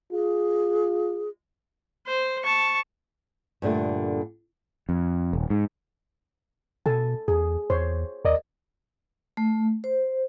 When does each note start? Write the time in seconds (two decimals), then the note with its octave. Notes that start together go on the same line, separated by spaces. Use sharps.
0.12 F4 G#4
2.07 C5
2.44 A5 C#6
3.62 G2 A#2 D3 A3
4.89 F2
5.33 D#1
5.50 G#2
6.86 B2 A4 G#5 A5
7.28 E2 G#4
7.70 E2 C5 C#5 C6
8.25 D#2 A#4 D5 D#5
9.37 A3
9.84 C5